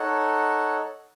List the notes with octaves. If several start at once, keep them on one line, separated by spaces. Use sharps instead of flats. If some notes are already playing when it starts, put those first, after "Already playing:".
Already playing: D#4 A4 C#5 F#5